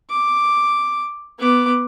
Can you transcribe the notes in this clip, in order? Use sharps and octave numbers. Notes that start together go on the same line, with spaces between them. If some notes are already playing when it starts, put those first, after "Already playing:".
D6
B3 D6